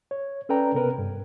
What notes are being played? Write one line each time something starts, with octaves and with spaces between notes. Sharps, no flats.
C#5
C#4 A4 B4 D5 G5 A#5
C3 B3 A#4 B4
G2